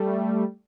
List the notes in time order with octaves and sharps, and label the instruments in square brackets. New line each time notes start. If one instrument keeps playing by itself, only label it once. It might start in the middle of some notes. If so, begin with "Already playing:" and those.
Already playing: [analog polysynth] G3 A3